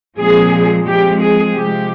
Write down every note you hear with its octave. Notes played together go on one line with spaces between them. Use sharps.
A#2 F3 G#3 C4 G#4
F3 G#3 C4 G4
G#4
C3 F3 G#3 G4